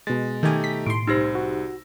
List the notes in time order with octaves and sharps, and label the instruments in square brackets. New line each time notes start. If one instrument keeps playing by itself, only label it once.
[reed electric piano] B2 A6 [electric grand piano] G#3
[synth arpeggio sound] D#3 G#5 [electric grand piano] A3 D#4 G4
[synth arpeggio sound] B6
[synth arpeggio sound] A2 C6 [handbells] D7
[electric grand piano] C2 E6 A#6 [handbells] D#4 G4 C5
[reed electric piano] F#4